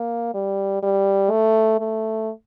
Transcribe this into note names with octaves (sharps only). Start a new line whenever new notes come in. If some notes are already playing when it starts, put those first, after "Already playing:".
Already playing: A#3
G3
G3
A3
A3